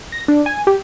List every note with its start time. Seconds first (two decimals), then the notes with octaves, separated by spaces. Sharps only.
0.12 A#6
0.28 D4
0.46 G#5
0.67 G4